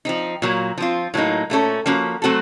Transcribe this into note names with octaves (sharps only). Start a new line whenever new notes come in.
F3 C4 D#4
A#2 F#3 A#3
F3 C4 F4
A2 F#3 A#3 D#4
A#2 A3 C#4 A4
F3 A#3 C#4 F#4
F#3 A3 C4 F#4 A4